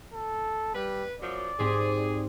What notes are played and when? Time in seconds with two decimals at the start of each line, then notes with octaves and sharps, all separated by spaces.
0.13 A4
0.74 G3 B4
1.20 F#2 F3 F#3 D5
1.59 G#2 C4 G4 G#4